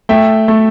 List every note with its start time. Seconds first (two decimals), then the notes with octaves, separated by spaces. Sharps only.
0.09 A3 E5 G5
0.48 A3